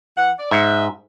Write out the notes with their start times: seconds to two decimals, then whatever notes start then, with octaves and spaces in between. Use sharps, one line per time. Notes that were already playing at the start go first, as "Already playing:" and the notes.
0.17 E3 F#5
0.38 D5
0.51 G#2 D#5 E5